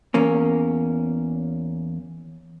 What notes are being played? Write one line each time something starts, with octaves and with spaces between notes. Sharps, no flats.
E2 A#3 C#4